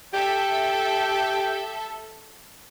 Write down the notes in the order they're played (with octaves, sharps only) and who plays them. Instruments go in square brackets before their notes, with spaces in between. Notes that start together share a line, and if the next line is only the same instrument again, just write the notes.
[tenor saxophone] G4 [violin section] A4 E5